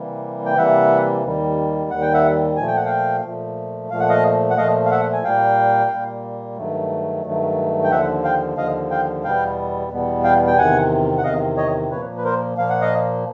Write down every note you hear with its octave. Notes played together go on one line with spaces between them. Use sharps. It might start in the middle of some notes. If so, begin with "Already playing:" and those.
Already playing: C3 E3 G3 A#3
G5
C3 E3 G3 A#3 E5 F#5
D#2 D#3 G3
D#2 D#3 G3 F#5
G5
E5 F#5
A#2 F3 A3 G#5
G5
F#5
F5 G5
A#2 F3 A3
A#2 F3 A3 F5
F#5
D#5 F5
F#5
A#2 F3 A3 D#5 F5
F5
E5 F#5
G#5
A#2 G3 A#3 F5 G5
A#2 G3 A#3
G2 D#3 F#3 A3
G2 D#3 F#3 A3
G5
D#2 D3 F3 E5 F#5
F5 G5
D#2 D3 F3 D#5 F5
F5 G5
E2 B2 G3 B3 F5 G5
E2 B2 G3 B3
F5 G5
G5
E2 C3 D#3 F#5 G#5
F#5
E2 C3 D#3 D#5 F5
C#5 D#5
A#2 F3 A#3 B4 C#5
B4
A#4 C5
A#2 F3 A#3 F5
F#5
D#5 F5